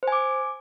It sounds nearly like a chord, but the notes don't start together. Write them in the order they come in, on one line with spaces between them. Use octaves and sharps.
C5 G#5 D6